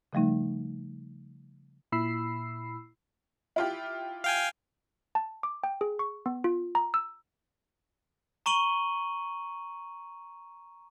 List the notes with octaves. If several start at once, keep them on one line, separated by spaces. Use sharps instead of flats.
C#3 F3 G3 A3 D#4
A#2 E4 B5 E6 C7
E4 F4 G4
F5 G5 G#5
A5
D6
G5
G#4
C#6
B3
F4
A#5
E6
A#5 C#6 D#7 F#7 G7